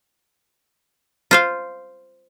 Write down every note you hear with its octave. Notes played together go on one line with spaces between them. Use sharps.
F4 C5 F5